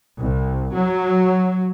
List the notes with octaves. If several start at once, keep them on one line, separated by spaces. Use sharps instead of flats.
C2
F#3